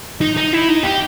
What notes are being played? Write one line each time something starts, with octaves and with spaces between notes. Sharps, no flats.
D#4
D#4
E4
D#4
G4